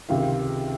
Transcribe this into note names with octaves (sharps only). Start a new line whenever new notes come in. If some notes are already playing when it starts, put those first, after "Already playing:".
C#2 C3 D#3 F5